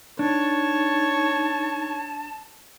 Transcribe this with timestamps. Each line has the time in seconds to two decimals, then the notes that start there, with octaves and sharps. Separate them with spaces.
0.19 D4 D#4 C#5 A5